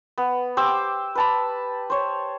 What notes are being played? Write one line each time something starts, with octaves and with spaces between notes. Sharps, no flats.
B3
G4 C5 D6 E6
B4 A5 B5
C5 C#5